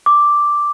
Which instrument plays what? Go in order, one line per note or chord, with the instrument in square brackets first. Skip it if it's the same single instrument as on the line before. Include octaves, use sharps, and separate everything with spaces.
[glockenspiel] D6